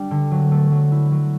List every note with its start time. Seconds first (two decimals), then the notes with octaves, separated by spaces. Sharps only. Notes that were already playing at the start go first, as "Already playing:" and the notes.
Already playing: G3 D4
0.11 D3
0.32 F#3
0.52 A3
0.71 F#3
0.92 E4
1.12 F#3